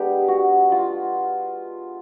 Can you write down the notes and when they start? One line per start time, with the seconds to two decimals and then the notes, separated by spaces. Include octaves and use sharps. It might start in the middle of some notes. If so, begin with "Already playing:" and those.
Already playing: G#3 B3 D4 G4
0.28 F#4
0.72 F4